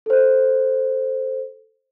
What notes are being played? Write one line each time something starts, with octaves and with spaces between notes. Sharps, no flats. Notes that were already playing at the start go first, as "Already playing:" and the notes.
A4 C5